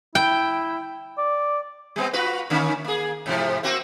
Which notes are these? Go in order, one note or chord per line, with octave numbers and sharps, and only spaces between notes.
E4 G5
D5
G3 B3 C4
F4 F#4 B4
D3 A#3 C#4
A#3 G#4
G#2 C3 F3
A#3 C4 F#4